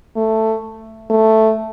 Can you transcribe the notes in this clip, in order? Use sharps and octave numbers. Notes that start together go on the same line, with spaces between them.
A3
A3